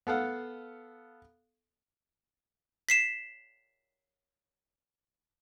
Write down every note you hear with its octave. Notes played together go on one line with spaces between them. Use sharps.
B3 A4 F5 F#5
B6 C7 E7